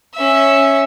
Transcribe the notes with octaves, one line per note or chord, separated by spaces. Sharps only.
C#4 E5